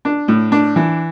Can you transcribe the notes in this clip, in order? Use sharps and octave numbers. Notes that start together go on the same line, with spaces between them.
D4
A2
D4
E3